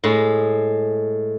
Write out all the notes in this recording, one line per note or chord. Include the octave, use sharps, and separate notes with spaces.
A2 G#3